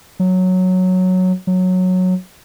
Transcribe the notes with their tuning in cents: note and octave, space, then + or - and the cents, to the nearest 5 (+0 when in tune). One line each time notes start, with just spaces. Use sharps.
F#3 -5
F#3 -10